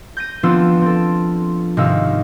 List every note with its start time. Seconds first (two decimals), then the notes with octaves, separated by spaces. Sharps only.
0.17 G6 A#6 D#7
0.43 F3 B3 C4 D4 F4 E6
0.82 C4 A4
1.77 G#1 C3 D#4 F5 E6